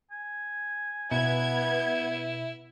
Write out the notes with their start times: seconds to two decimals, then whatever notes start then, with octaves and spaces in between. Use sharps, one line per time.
0.11 G#5
1.11 B2 B3 E4 G#6